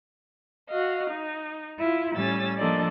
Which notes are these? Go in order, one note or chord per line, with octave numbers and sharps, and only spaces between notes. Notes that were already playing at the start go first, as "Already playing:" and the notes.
F#4 D#5 F5
D#4
E4 F4
A2 G3 C#4 E6 A6
F3 A#3 D4 A4 D5 D#5